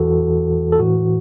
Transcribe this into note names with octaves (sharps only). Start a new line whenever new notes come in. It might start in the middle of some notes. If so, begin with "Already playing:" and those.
Already playing: E2 E3 F#4 A4
A4
A2 E3 F#4